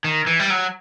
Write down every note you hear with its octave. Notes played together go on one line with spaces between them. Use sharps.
D#3
E3
G3
F#3